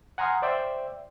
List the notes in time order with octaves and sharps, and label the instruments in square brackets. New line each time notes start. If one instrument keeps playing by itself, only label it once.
[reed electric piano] F#5 G#5 A#5 C6 D#6 F6
C5 D5 E5 G5